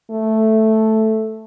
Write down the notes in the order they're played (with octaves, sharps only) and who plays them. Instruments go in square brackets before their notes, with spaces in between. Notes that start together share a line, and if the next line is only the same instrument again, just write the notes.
[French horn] A3